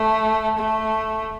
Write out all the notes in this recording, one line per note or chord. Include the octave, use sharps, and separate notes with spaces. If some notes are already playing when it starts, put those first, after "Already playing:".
Already playing: A3
A3